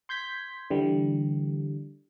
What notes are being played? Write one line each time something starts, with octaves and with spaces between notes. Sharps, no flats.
C6 G6 G#6 B6
D3 E3 G3